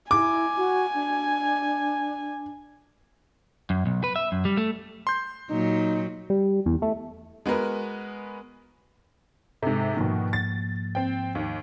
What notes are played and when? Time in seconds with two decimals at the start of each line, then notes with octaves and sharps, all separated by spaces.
0.11 E4 G#5 D6
0.57 F#4
0.94 D4
3.70 F#2
3.86 B1
4.04 B4
4.16 E5
4.32 F#2
4.45 G3
4.57 A3
5.07 C6 G6
5.50 A#2 F#3 D#4
6.30 G3
6.66 E2
6.82 A3
7.46 G#3 B3 F#4 A#4 B4
9.62 G#2 C3 A4
9.97 G#2 B2 D#3 F3 A#3
10.33 A6
10.95 C4 G5
11.35 D#2